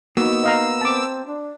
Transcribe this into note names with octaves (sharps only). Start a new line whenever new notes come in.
A#3 B3 D#4 F#4 E6
D#5 F5 A#5
C4 A5 D6
D4